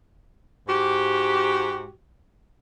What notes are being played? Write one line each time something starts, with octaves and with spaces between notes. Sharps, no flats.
G#2 F#4 G4